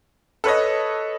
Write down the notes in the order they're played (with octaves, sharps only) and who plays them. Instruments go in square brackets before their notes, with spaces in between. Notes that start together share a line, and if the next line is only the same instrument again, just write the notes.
[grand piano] A4 B4 C#5 D#5